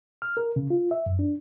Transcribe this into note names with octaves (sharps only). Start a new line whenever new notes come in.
F6
A#4
C#3
F4
E5
F#2
D4